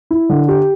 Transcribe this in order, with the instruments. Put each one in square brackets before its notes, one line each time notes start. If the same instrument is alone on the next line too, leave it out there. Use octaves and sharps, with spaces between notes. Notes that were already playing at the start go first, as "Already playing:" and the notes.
[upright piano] E4
D3
G4